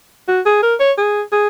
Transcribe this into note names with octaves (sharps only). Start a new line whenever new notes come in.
F#4
G#4
A#4
C#5
G#4
G#4